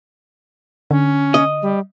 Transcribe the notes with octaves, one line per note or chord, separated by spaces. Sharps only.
D3 C#4
D#5
G3